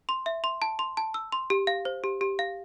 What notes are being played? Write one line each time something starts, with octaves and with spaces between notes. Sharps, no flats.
C6
E5
C6
A5
C6
A5
E6
C6
G4
F5
C5
G4
G4
F5